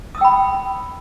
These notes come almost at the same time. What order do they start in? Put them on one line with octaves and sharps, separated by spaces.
D#6 E6 G5 B5